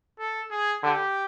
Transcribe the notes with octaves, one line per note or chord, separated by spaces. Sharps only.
A4
G#4
D3 G4